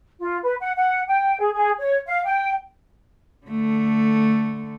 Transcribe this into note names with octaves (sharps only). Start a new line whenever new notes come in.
F4
B4
F#5
F#5
G5
G#4
G#4
C#5
F5
G5
D3 A3